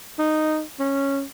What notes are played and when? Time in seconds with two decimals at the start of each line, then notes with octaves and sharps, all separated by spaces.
0.19 D#4
0.80 C#4